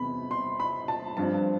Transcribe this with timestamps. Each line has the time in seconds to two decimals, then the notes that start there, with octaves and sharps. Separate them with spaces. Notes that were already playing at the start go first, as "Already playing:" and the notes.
Already playing: E2 C3 E3 B5
0.31 C6
0.60 B5
0.88 A5
1.17 G2 F3 C4 A5